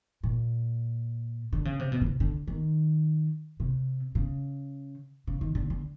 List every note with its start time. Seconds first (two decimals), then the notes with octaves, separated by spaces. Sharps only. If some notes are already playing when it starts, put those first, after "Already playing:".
0.23 A#2
1.53 D3
1.65 C#3
1.79 C3
1.92 B2
2.01 C#3
2.06 C3
2.20 D3
2.48 D#3
3.60 C3
4.15 C#3
5.27 C#3
5.41 D#3
5.55 D3
5.70 D3